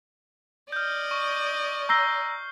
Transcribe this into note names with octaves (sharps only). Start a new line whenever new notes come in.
D5 D#5 F6 G6
C#6
A#5 E6 G6 A#6 C7 G7